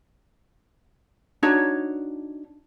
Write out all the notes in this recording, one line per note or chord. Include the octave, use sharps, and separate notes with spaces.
D4 D#4 F#4 C#5